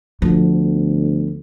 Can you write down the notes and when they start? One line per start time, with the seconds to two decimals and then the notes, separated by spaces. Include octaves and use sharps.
0.22 D2 F3 B3